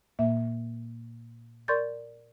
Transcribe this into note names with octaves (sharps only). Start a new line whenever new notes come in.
A#2 A#3 E5
A#4 D5 C6 C#6 G6 A6